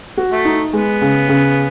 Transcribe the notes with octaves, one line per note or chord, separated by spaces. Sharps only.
F#4
A3
D#4
G#3 B3
C#3
C#3